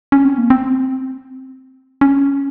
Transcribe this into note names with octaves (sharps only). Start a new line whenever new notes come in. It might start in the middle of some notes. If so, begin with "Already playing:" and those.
C#4
C4
A#3
C4
C#4